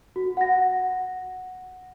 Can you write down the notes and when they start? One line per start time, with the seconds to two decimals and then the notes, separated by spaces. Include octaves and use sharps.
0.16 F#4
0.37 F#5 A#6